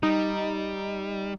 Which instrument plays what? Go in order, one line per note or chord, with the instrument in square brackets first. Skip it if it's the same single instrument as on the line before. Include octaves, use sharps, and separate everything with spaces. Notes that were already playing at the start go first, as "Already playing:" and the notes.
[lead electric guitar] G3 [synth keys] D#4